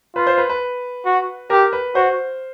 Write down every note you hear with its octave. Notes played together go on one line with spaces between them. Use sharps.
F4 B4
C5
B4
B4
F#4
G4 A#4
B4
F#4 C5